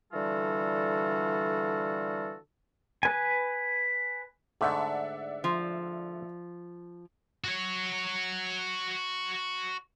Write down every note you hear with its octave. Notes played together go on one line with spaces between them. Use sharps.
D3 E3 G3 F4 F#4 A4
B4 G#5
G#2 D3 A3 D5 E5 F#5
F3
F#4 C#5